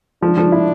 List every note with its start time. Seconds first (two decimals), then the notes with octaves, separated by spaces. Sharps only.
0.22 F3 D4
0.38 F3
0.52 E4